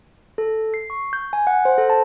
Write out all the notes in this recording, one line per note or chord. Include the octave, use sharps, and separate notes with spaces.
A4
C7
C#6
G6
G#5
F#5
C5
A4
A5